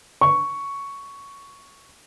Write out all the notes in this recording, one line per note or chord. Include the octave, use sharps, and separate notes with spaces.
C#6